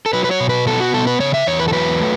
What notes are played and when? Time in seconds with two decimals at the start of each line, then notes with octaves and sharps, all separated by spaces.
0.06 A4
0.13 F#3 B4
0.24 B4
0.31 C#5
0.40 B2
0.49 B4
0.67 B3 A4
0.80 F#4
0.94 B2 A4
1.07 B4
1.20 C#3 C#5
1.34 E5
1.47 E2 C#5
1.60 B4
1.68 A4
1.73 F#3 B4
2.01 A3